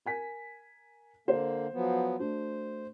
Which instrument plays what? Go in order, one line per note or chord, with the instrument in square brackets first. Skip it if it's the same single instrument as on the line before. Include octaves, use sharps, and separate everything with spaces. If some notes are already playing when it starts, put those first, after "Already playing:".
[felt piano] A#4 G#5 B6
[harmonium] D3 A#3 [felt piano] C5
[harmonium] F3 F#3 B3
[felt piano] A3 D4 F#4 [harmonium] C5